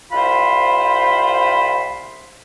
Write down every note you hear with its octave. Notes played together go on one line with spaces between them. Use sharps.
C2 F4 C5 B5